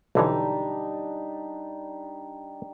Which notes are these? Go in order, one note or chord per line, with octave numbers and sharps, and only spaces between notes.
B1 D3 E3 G3 D4 D#4